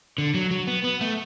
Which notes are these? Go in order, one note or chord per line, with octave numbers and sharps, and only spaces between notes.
D3
F#3
F#3
B3
B3
A3